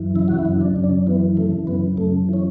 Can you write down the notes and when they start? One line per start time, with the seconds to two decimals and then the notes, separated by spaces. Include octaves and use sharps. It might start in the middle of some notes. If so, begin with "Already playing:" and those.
Already playing: F#2 E3
0.15 C#3 E4
0.28 F#4
0.39 E4
0.45 F#2
0.61 D4
0.76 F#2
0.84 D4
1.07 E3 B3
1.37 C#3 A3
1.67 F#2 B3
1.97 F#2 A3
2.29 E3 C#4